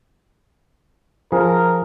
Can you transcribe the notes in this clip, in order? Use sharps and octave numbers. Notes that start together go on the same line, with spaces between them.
F3 G#4 A#4